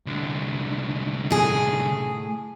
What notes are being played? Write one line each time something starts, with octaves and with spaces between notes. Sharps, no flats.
C2 D3
A2 G#4